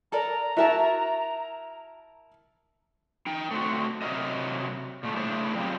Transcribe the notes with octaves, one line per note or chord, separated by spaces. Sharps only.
A4 A#4 D5 A#5
E4 F#4 A#4 E5 A5
D#4 G5
A3 C4 F#4
C3 D#3 F#3 A#4 D#5
A#2 A3
A3 D4 E4 G#4 C5 C#5
F#3 C4 F4 G4 G#4